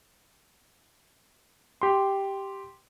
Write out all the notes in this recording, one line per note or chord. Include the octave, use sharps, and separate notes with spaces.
G4 C6